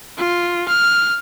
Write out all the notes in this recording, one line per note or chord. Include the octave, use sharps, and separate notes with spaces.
F4
F6